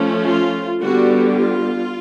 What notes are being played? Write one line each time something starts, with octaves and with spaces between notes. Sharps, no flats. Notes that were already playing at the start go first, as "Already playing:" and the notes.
Already playing: F3 A3 C#4
F4
D3 G3 B3 F#4
F4